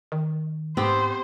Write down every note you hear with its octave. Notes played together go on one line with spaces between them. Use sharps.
D#3
G#2 B3 C4 G4 C5